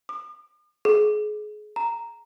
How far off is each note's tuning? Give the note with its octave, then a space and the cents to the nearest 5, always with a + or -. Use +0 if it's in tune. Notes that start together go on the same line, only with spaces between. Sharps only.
D#6 -45
G#4 +30
A#5 -5